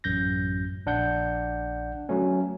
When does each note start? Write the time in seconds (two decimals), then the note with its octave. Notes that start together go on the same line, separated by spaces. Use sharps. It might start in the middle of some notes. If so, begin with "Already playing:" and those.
0.04 A1 F#2 G6 A#6
0.86 A#1 D4 F#5 G6
2.09 F#3 A3 C#4